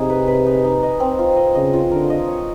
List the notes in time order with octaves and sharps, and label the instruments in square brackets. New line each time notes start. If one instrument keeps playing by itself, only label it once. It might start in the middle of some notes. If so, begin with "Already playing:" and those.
Already playing: [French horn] C3 [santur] D#4 G#4
[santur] B4
B4
D#4
D#4
D#5
C4
F4
D#5
[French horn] C#3 [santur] D#5
[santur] F4
[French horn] D3 [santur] A#4
[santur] D#5
C#5